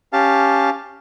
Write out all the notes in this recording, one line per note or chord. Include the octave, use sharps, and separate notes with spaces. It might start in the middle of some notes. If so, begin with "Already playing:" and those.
C#4 G4 F5 A5